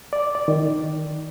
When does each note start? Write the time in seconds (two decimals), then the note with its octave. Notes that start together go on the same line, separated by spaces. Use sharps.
0.13 D5
0.35 D5
0.48 D#3